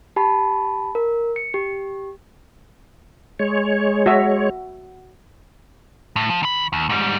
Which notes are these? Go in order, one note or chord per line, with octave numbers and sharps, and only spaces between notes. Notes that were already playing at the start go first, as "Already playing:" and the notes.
G4 A5 B5
A#4
C#7
G4
G#3 C#5
F#4 E5
A2
F3
D#3 B5
D#2
G#2 G3